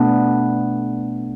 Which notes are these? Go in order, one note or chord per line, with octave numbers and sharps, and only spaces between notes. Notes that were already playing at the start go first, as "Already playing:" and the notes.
Already playing: B2 A3 B3 D4